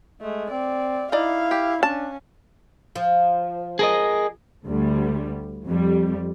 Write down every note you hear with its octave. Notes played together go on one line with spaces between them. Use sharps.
G#3 A3
C4 D5
D#4 E4 D5 F5
G4
C#4 D4 A5
F3
G#4 A#4 D#5
D2 G3
F2 G3